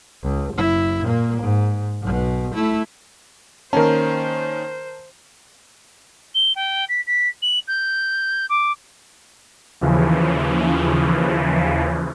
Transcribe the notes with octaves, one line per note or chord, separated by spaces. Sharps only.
C#2
F#1 E4
A#2 A#3
G#2
B1 B2
A3 E4
D#3 A#3 C#4 A#4 C5 A5
G7
G5
B6
B6
F#7
G6
D6
D#2 C#3 E3 F3